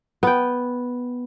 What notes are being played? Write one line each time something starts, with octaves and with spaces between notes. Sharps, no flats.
B3 G5